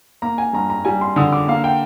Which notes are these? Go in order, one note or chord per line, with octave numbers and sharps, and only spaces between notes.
A#3 A#5
G#5
G2 A#5
A#5
G3 G#5
C6
D3 D#6
D6
A#3 F5
G5